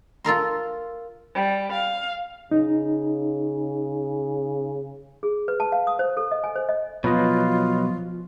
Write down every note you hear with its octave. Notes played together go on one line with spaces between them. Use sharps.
F4 A4 A#4 C6
G3
F5
C#3 D#4
G#4
B4
A5
F5
D#6
C5
A4
D#5
G#5
C5
D#5
B2 F3 F#3 F4 B4 D#5